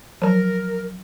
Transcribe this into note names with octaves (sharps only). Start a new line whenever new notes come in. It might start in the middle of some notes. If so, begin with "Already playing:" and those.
F3 F#3 A#4